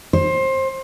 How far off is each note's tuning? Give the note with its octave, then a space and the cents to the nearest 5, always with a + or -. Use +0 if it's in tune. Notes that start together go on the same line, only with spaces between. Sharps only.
C5 +25